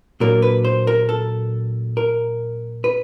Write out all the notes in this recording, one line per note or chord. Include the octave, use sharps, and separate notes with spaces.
A#2 F#3 A#3 D4 A#4
B4
C5
A#4
A4
A#4
B4